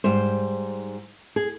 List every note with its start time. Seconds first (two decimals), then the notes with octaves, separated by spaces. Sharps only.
0.04 G#2 G3 C5
1.36 G#4